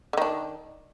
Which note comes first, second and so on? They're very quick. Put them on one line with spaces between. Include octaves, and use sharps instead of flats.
D3 D#3 D4